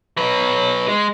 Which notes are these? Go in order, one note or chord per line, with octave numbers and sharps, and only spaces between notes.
F#3 B4
G#3